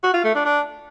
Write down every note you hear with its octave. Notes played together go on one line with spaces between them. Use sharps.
F#4
F4
A3
D4
D4